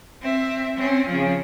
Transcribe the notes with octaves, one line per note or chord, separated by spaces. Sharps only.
C4 E5
C4 C#4
C#3 F3